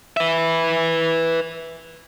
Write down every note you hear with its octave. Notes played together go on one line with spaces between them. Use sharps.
B4 E5